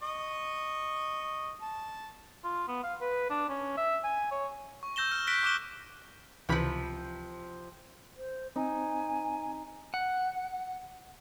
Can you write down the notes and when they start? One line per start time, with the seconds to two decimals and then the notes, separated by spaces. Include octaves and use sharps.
0.03 D#5 C#6 D#6
1.62 A5
2.44 F4
2.68 B3
2.84 F5
3.01 B4
3.30 D4
3.49 C#4
3.77 E5
4.04 G#5
4.32 C#5
4.83 C#6
4.96 E6 G6 A#6 E7 G7
5.12 F6
5.27 F#6 A#6 B6 D7 G7
5.43 C#6 D6 F#6 E7 G7
6.49 C#2 C3 E3 F3 B5
8.17 C5
8.56 C4 D#4 G#5
9.94 F#5